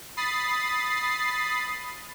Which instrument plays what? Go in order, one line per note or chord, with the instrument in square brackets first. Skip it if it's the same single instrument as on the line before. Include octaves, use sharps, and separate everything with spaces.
[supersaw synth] B5 D#6 A6 C7